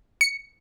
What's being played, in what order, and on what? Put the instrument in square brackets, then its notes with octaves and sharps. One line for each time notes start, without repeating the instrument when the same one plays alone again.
[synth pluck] C#7